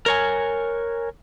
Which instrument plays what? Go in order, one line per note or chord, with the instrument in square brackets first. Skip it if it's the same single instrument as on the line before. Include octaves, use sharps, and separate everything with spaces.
[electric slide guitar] A#4 C#5 G#5